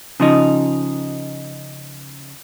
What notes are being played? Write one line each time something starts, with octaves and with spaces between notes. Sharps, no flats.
C#3 F3 D#4